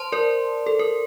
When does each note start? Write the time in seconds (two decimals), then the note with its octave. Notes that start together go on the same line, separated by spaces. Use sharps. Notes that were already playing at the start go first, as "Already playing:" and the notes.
Already playing: C5 A5 C6
0.12 A#4 D5
0.66 A4
0.79 A#4